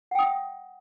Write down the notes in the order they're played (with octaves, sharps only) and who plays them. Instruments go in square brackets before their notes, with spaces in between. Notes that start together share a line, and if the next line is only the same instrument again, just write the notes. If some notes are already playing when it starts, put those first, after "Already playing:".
[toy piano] F#5
G5
D#6
E5